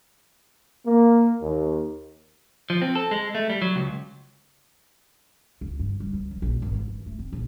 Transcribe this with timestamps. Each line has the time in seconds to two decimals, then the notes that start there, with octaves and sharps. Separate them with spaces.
0.86 A#3
1.42 D#2
2.70 F3
2.82 C4
2.95 A4
3.11 G#3
3.35 A3
3.50 G3
3.62 F#3
3.76 C#2
5.61 C#2
5.79 G2
6.00 G3
6.13 C#2
6.31 F#3
6.42 A#1
6.62 G#1
6.75 G#2
6.88 E3
7.06 A3
7.19 C4
7.32 A#1